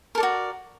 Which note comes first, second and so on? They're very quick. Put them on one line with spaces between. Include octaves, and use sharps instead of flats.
A#4 A4 D5 F#4